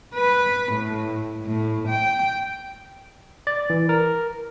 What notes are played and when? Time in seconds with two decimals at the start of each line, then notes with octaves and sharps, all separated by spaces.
0.14 B4
0.73 A2
1.45 A2
1.89 G5
3.47 D5
3.70 E3
3.89 A#4